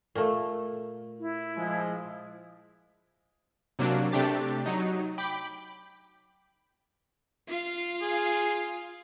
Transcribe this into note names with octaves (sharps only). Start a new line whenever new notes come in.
A#2 A3
E4
F3 G#3
C3 F#3 A#3 D4
C3 A3 D4 G4 A6
F#3 D#4
G5 B5 D6
F4 F5
G#4